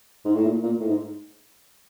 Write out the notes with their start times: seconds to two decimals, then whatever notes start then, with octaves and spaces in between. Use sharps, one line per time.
0.25 G#2
0.35 A2
0.46 A#2
0.63 A#2
0.80 A2
0.88 G#2